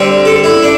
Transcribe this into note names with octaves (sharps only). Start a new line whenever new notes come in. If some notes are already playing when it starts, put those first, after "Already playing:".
Already playing: D3 G3 C4
A4
E4
D4